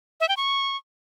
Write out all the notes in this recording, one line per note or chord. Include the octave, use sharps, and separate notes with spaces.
E5
G5
C#6